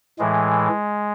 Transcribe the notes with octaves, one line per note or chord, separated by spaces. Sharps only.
A2 E3 G#3